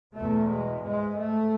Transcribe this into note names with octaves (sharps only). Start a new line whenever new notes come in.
E2 B2 A3
G#3
G#2 G#3
A3